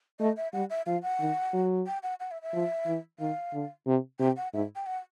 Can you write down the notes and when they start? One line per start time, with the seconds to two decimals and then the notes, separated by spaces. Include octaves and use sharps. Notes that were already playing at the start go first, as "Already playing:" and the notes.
0.20 A3 D#5
0.37 E5
0.53 G3 F#5
0.70 E5
0.86 F3 F5
1.03 F#5
1.20 D#3
1.53 F#3
1.87 G5
2.03 F#5
2.20 F#5
2.31 E5
2.42 E5
2.54 F3
2.86 E3
3.19 D#3 F5
3.53 D3
3.87 C3
4.20 C3 G5
4.37 F#5
4.53 G#2 E5
4.76 G5
4.86 F#5